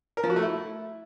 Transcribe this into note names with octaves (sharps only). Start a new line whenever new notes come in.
A#4
F3
F#4
A3
E4